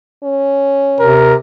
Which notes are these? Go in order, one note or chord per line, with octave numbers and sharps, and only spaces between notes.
C#4
C3 A#4